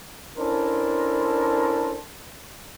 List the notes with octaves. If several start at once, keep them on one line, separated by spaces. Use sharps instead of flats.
C#4 D4 E4 A4 A#4 C5